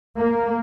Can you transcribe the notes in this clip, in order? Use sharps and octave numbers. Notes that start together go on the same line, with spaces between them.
A#3